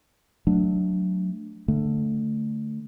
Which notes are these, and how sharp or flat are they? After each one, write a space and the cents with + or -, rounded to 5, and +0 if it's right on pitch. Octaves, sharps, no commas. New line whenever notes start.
F#3 +0 A3 +0 D4 +0
D3 +0 A3 +5